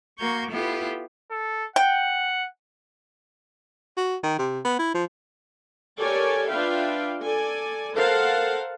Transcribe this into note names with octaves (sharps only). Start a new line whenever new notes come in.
A#3 F#4 A#4 C#6 G6 G#6
B3 E4 F4 G4 A4 B4
A4
F#5 G5
F#4
D#3
C3
B3
E4
F3
G4 A4 A#4 C#5 D5 G#5
D4 F4 B4 E5 F5 G5
A4 D5 G#5
A4 A#4 C5 F5 F#5 A5